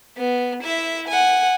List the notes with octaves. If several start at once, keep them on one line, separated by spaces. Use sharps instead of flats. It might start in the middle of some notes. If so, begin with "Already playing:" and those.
B3
E4 E5
F#5 G#5